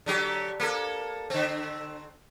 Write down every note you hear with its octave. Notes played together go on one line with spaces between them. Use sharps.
D3 F#3 G4
A#3 A4
D3 C4